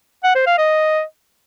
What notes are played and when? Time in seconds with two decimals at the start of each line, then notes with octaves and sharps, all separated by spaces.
0.24 F#5
0.35 C5
0.47 F5
0.58 D#5